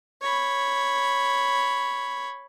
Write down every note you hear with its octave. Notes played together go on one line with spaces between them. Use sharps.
C#5 B5